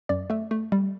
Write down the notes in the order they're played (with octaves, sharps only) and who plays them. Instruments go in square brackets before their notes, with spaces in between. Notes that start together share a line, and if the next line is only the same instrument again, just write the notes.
[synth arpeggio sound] F#2 D5
A3 E5
A3
G3